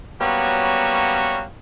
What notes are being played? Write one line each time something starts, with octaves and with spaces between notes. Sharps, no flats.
F#3 G3 A#3 B3 C#4 F#4